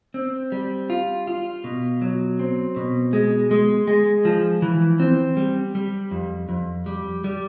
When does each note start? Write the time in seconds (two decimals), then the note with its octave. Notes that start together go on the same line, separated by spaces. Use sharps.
0.14 C4
0.52 G3
0.90 F4
1.27 F4
1.64 B2
2.02 F#3
2.39 C4
2.76 B2
3.13 G#3
3.51 G#3
3.88 G#3
4.25 F3
4.62 E3
5.00 C4
5.37 G3
5.75 G3
6.11 F2
6.49 F2
6.86 G3
7.24 G3